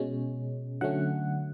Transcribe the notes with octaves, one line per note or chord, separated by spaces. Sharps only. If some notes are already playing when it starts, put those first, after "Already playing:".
Already playing: B2 G#3 C#4
D3 F#3 A3 C#4 F#5